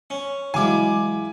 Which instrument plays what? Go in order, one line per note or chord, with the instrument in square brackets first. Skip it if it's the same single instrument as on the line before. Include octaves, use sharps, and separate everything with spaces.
[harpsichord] C#4
[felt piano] E3 F#3 G#3 [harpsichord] E4 F5 [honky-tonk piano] G#5 D6